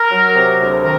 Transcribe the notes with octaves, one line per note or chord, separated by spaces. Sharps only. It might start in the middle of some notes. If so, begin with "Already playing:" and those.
Already playing: A#4
F#3
C3
D2
D#3 A#4